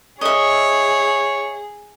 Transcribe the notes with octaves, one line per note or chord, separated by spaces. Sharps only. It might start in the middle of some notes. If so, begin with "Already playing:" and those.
G#4 C#5 D#5 E5